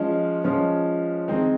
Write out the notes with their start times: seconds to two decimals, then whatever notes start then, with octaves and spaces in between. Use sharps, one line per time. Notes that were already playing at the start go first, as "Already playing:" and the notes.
Already playing: F3 G#3 C#4 F4
0.44 F3 G#3 C#4 F4
1.28 D#3 G#3 C4 D#4